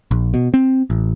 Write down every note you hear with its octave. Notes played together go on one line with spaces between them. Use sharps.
A#1
B2
C4
A1